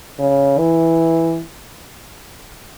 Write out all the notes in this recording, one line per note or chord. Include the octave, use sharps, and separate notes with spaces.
C#3
E3